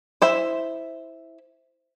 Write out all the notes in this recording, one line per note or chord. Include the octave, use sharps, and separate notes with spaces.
E4 C5 E5